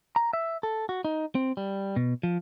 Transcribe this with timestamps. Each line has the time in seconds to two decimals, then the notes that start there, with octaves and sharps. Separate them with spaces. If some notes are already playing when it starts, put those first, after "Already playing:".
0.16 A#5
0.33 E5
0.63 A4
0.89 F#4
1.05 D#4
1.35 C4
1.57 G3
1.96 B2
2.23 F3